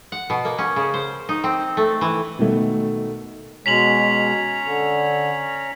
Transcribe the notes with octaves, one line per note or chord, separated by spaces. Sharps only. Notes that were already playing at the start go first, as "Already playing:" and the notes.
F#5
B2
A#3
C#4
C#3
C5
D#4
C4
A3
E3
B2 D#3 A3
B2 G#3 C#4 C#5 A#5 B6 F7 F#7
D3